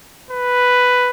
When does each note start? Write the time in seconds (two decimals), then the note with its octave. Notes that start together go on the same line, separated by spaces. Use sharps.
0.31 B4